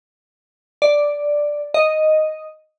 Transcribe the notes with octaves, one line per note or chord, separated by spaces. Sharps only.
D5
D#5